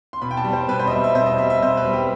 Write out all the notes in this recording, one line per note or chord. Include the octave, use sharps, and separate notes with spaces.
C6
B2 B5
G5
A5
G3
C5
B2 B4
C5
D#5
G3 E5
E5
B2 C5
D#5
G3 E5
E5
B2 C5
B4
G3
G4